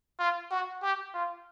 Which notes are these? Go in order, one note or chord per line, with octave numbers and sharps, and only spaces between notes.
F4
F#4
G4
F4